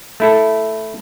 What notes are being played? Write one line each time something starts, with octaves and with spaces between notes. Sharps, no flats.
A3 E4 A4